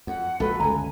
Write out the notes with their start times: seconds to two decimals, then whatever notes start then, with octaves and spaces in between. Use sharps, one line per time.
0.07 F2 F#5
0.40 A#1 G#3 F#4 A4 B4
0.60 G1 C#2 A4 G#5 A#5